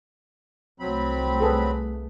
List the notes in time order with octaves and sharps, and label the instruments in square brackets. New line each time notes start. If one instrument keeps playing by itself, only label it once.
[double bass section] C2 A3 [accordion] F#3 C4 B5
[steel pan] G#4 A4 B4